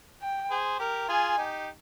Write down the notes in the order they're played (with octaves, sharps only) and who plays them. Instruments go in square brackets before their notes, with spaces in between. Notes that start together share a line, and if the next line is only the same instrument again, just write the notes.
[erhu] G5
[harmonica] G#4 C5
G4 A#4
[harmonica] F4 G#4 [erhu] G#5
[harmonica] D#4 G4